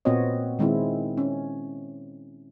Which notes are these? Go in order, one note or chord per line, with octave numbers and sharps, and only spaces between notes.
A#2 B3 C4 F#4 C#5 D#5
D#3 G#3 C4 E4
C#4